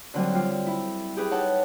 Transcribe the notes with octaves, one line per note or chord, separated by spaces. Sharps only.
D3 D#3 F#3 G3 C4 G#5
G3 F4
E4
G4 G#4 B4
D#4 A4 C#5 F#5 A5